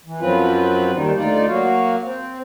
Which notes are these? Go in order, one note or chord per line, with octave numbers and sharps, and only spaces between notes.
E3
F#2 F3 F#3 C4 F4 B4
D#2 D#3 G3 D#4
D2 D#4 F4 D5
F#3 A#3 F#4 F5
C4